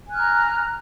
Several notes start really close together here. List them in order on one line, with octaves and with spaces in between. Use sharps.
G#5 F#6 F6 A#5